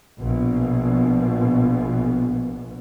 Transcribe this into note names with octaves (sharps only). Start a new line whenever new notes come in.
A#1 B2